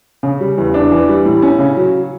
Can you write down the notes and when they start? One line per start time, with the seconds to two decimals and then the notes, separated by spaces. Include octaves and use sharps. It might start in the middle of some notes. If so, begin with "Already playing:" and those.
0.23 C#3
0.40 G3
0.58 E2
0.74 D4
0.91 E3
1.09 G3
1.25 A2
1.42 C#4
1.59 C#3
1.77 F#3